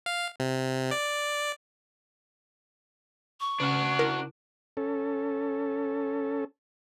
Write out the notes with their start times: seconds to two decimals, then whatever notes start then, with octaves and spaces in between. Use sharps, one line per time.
0.06 F5
0.40 C3
0.91 D5
3.40 C#6
3.60 C#3 C#4 D4 F#4 F6
3.99 E4 A#4
4.77 C#4 A4